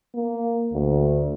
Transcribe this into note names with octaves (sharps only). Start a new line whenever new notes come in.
A#3
D2